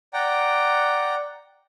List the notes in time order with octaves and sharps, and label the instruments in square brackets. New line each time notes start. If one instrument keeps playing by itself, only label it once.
[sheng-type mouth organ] D5 F#5 G5 A#5